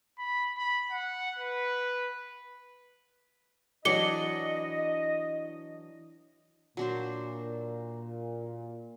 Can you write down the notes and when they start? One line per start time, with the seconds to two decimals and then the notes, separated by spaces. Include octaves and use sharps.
0.19 B5
0.58 B5
0.91 F#5
1.39 B4
3.85 E3 F#3 D4 D#5 D6 C#7 G7
6.77 A#2 F#3 D4 C5